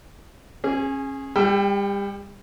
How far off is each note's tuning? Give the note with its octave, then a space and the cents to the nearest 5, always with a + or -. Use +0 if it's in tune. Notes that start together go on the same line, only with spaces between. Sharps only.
C#4 -30 G#4 +0
G3 +35 G5 +0 E6 +45